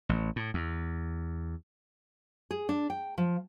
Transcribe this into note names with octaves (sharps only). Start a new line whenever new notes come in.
A1
A2
E2
G#4
D4
G5
F3